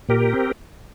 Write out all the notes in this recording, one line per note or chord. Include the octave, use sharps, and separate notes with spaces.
A#2 G4 A#4
C4